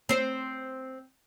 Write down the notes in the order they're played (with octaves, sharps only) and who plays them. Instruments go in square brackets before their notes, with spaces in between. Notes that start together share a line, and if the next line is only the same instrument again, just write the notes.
[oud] C4 C5